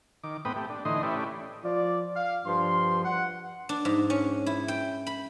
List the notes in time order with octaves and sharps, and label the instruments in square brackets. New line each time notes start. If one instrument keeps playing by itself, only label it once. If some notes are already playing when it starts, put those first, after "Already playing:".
[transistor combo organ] D#3 D6
A2 B3 C4 G5 B5 D#6
A3 G4
D4
A2 D3 E3 D#4 D#5 C6
A3 C#4 E4 G4 B4 D5
[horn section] F3 F4 D5
F5
G2 F3 C6
F#5
[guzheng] D4
G#2
C#4
E4
G5
B5